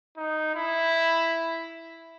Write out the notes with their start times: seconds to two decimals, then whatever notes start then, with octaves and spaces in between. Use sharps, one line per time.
0.17 D#4
0.55 E4